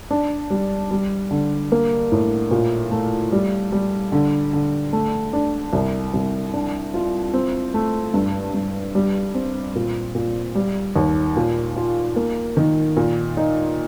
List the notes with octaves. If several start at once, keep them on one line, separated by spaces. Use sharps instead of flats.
D4
G3
G3
D3
A#3
A2
A#2
A3
G3
G3
D3
D3
A3
D4
C2
C2
D4
F4
C4
A3
G2
G2
G3
C4
A#2
A#2
G3
D#2
A#2
F4
A#3
D#3
A#2
D#4